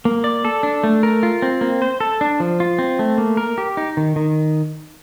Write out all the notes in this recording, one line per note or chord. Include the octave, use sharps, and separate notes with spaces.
A#3
D5
A4
D4
A3
A#4
F4
C4
A#3
C5
A4
D4
F3
F4
C4
A3
A#3
A#4
G4
D#4
D#3
D#3